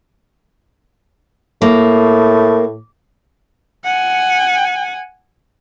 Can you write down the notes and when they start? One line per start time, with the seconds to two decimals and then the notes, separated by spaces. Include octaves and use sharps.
1.62 A2 A#3
3.85 F#5 G#5